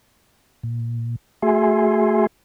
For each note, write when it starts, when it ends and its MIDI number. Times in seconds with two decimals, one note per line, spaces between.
0.63 1.16 46
1.42 2.27 57
1.42 2.27 66
1.42 2.27 68
1.42 2.27 76
1.42 2.27 80
1.42 2.27 84